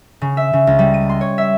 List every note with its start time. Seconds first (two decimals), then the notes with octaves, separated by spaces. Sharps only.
0.21 C#3
0.37 E5
0.53 C#3
0.67 C#2
0.79 G3
0.94 D#7
1.09 C6
1.21 C#5
1.38 E5